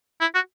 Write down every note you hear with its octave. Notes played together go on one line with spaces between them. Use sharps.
E4
F#4